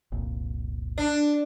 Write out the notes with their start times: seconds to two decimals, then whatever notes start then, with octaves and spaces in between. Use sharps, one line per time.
0.12 F1 C2 A#2
0.98 D4